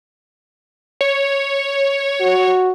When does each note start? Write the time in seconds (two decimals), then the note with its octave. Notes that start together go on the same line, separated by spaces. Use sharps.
1.01 C#5
2.21 F#4